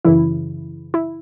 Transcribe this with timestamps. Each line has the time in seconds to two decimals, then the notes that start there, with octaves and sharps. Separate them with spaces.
0.05 F#2 C#3 E3 E4
0.94 E4